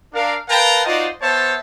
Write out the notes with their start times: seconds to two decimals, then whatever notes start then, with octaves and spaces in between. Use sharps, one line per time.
0.13 D4 A#4 F5
0.48 A#4 B4 F5 G5 A5 A#5
0.86 D#4 F4 F#4 C5 D5 D#5
1.22 B3 C5 C#5 E5 A5